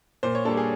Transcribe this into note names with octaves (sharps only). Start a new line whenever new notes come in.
A#2 C5
C#5
G3 A#3 D4 A4
G#4